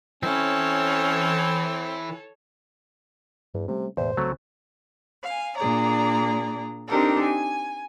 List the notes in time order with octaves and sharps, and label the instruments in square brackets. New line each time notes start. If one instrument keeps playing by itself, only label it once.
[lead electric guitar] E3 E4 [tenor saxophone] C4 [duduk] C#4 [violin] A4 C#5
[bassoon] E2 [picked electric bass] G2
[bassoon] C3 [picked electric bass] G3 A3 C#4
[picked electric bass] E1 A2 [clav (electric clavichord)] E2 [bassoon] C5
[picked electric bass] C2 C#3 C4 [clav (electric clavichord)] F#3 A3
[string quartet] F5 G#5
A#2 D4 G#4 D5 A#5
C4 D4 D#4 G4 A4 A#4
G#5